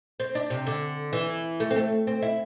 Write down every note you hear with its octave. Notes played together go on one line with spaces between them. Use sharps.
C4
D4
C3
D3
E3
A3
C4
A3
C4
E4